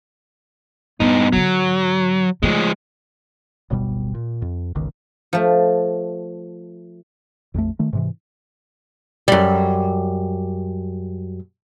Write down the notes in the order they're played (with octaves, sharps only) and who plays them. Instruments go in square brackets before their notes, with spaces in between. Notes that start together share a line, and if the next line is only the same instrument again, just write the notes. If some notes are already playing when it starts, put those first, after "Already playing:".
[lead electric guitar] G2 D#4 [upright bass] B3
[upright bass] G#2 D3 [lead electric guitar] F#3
[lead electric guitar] F3 G#3 [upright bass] A3
[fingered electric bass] D1 G1 B2 G3
A#2
F2
G1 C#2 D#3
[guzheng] F3 A3
[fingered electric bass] A#1 F2 F3 A3
D#3 A3
G#2 C3 E3
[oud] F#2 G3